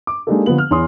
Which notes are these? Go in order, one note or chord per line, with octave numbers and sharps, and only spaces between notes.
D6
G#3 A#3 D4 D#4 G4 A4
D3 F3 B3 F#7
F6
E2 C#5 C6 D#6